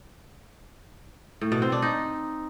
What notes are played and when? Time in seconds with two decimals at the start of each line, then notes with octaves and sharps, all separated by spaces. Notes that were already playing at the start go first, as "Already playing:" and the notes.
1.41 A2
1.52 B2
1.62 C4
1.72 D4
1.82 D#4